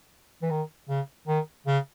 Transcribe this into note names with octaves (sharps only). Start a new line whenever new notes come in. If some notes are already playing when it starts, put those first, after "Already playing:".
E3
D#3
C#3
D#3
C#3